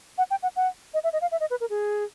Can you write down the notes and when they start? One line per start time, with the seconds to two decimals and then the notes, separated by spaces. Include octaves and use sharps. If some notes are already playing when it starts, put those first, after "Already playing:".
0.18 F#5
0.31 G5
0.43 F#5
0.56 F#5
0.94 D#5
1.04 E5
1.13 D#5
1.22 F5
1.32 E5
1.40 D#5
1.51 B4
1.61 A#4
1.70 G#4